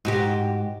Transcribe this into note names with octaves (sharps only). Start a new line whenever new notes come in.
G#2 F#4 G4